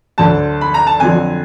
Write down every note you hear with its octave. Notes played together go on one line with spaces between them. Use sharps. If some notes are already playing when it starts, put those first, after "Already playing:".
D2 D3 F#3 A5
B5
A#5
A5
F2 D3 F#3 G#5